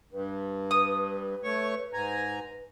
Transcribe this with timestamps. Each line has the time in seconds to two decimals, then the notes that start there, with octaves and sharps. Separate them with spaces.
0.12 G2 B4
0.71 B4 D#6
1.44 A3 C#5 C#6
1.93 G#2 G#5 A#5